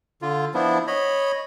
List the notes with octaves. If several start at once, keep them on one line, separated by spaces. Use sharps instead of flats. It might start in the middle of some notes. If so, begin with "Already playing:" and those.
D3 F4
F3 B3 D4 E4
C#5 D#5 B5